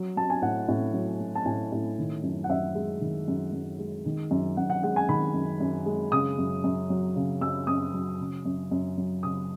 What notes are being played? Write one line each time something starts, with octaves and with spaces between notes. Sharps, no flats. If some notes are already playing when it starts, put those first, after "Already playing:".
Already playing: F#3
F#3 A5
G#5
A2 F#5
A2
F#3
F#3
A5
A2 G#5
A2
D#3
F#2
F#5
F#2 E5
G#3
D#3
F#2
F#2
G#3
D#3
F#2
F#2 F#5
F#5
G#3 F#5
G#5
D#3 B5
F#2
F#2
G#3
C#3 D#6
F#2
F#2
F#3
C#3
F#2 E6
F#2 D#6
F#3
C#3
F#2
F#2
F#3
C#3 D#6